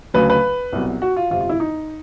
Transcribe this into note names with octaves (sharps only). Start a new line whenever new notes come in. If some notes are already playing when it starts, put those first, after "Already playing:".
D2 C#3 F#3 B4
B4
C2 B2 F#3
F#4
F4
G1 F2 C3 F4
F4
E4
D#4